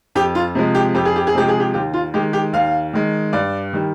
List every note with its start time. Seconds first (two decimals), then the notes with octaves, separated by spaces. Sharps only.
0.15 F2 G4
0.35 F4
0.55 C3 F3 G#3
0.75 G4
0.94 F2 G4
1.05 G#4
1.16 G4
1.27 G#4
1.35 C3 F3 G#3 G4
1.48 G#4
1.60 G4
1.74 D#2 G4
1.94 F4
2.14 D#3 G#3 G4
2.33 G4
2.53 D#2 F5
2.93 D#3 G#3
3.33 G2 D5
3.73 D#3 G3